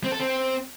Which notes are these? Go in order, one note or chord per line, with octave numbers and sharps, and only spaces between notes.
C4
A4
C4